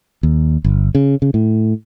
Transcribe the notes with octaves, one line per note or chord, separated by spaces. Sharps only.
D#2
G1
C#3
C#3
A2